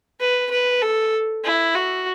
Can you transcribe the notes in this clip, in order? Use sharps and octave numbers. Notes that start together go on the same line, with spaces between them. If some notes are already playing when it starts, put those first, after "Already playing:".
B4
B4
A4
E4
F#4